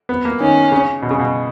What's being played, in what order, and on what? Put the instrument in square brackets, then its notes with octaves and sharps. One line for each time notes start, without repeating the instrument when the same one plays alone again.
[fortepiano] B3
A#3
[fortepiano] D#3 [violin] C#4
[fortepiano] C#3
B2
C#3
B2